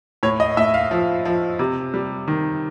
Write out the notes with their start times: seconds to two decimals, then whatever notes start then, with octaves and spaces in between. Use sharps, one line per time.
0.23 A2 C#5
0.40 D#5
0.57 A2 E5
0.74 F5
0.91 F3
1.25 F3
1.59 C3
1.94 G3
2.28 D#3